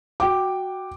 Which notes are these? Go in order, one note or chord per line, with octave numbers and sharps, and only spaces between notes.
F#4 G5 D6